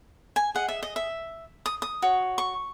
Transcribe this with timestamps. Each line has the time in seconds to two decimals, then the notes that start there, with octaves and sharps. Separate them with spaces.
0.36 G#5
0.55 G#4 D#5 F#5
0.68 E5
0.83 D#5
0.96 E5
1.66 D#6
1.82 D#6
2.02 F#4 C#5
2.38 C#6